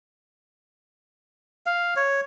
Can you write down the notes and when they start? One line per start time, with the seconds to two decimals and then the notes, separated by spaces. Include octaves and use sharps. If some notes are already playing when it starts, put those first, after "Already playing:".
1.66 F5
1.96 C#5